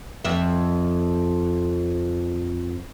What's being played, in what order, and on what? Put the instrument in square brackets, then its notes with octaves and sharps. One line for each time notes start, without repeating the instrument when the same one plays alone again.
[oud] F2 E5